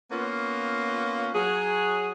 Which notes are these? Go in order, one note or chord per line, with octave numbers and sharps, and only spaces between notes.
A#3 B3 C#4 F4
F#3 G#4